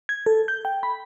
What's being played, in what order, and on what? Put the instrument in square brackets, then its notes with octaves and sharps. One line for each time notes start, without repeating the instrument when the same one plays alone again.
[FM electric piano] G#6
A4
G6
G5
B5